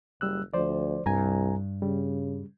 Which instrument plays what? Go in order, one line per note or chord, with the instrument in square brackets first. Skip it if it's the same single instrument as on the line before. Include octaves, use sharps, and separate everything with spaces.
[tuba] F#1 [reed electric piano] G3 E6 F#6
[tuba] D2 [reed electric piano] F3 C5 D5
[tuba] C2 [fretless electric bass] G2 [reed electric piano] G#5 A#5
[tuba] C#3 [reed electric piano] G3